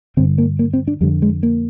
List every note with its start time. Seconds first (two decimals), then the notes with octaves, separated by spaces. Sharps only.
0.17 G2 D3 C4
0.38 A#3
0.59 A#3
0.73 C4
0.88 D4
1.01 F2 D3 G3
1.22 G#3
1.43 A#3